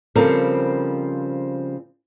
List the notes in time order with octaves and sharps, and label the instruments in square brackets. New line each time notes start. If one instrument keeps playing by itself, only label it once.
[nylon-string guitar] C#3 F3 G3 C4 A4 A#4